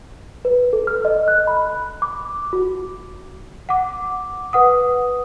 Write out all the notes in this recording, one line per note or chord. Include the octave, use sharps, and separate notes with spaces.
B4
A4
F6
D#5
F#6
B5
D6
F#4
F#5 D6
B4 F#5 D#6